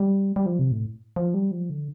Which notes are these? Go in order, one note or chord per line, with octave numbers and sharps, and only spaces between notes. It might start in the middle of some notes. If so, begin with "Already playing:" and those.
Already playing: G3
G3
F3
C3
A2
F3
G3
F3
D3